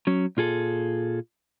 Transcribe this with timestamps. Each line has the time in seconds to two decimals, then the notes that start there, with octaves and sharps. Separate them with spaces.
0.07 F#3 C#4
0.37 A#2 F4 G#4 A4